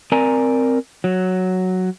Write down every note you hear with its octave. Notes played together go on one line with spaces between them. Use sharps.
C4 A#4 D5 G#5 A#5
F#3